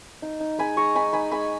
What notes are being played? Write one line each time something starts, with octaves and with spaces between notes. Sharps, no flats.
D#4
D#4
G#3 G#5 B5
G#3 A#5 C#6
D#4 G#5 B5
D#4 G#5 B5
G#3 G#5 B5